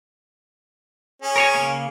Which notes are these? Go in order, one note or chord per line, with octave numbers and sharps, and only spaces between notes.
C#4 G#4
A#4 C#5 G#5
C#3 A#3